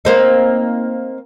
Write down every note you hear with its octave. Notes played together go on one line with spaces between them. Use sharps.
A#3 C4 D#4